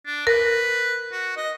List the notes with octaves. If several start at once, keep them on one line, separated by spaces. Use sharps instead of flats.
D4
A#4 B4
F#4
D#5